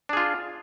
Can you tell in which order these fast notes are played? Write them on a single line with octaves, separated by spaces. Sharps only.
D4 G#4 F4